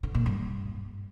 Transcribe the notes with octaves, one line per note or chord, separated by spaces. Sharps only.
D3
A#2
G2